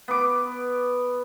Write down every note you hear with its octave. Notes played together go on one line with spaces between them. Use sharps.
B3 D6